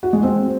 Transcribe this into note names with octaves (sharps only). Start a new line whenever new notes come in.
F#4
G#3
C4